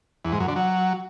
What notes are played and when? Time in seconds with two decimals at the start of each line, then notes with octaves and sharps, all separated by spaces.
0.25 E2
0.32 G#2
0.40 F#2
0.48 D3
0.56 F#3